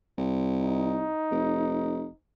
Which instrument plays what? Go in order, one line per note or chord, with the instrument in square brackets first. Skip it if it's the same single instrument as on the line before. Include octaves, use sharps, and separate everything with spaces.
[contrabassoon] C2
[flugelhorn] D#4
[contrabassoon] F1